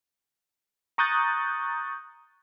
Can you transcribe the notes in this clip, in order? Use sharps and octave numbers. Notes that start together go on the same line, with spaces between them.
A#5 C#6 D#6 F#6 G6 A6